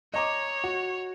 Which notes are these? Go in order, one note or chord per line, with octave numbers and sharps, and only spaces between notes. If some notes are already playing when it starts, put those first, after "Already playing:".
C#5 D#5 A#5 D6
F#4